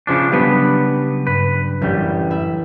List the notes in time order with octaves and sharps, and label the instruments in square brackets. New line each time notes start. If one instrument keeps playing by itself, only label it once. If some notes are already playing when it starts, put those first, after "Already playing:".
[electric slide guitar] C#3 F3 D4
[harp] C#3 F#3 D4 [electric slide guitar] G3 B3 B4
[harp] G2 [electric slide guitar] B4
[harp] A1 [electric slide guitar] F#2 G3
[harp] E5 B5